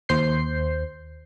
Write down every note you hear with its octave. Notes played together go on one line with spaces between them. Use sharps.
D#2 C5 G6 C7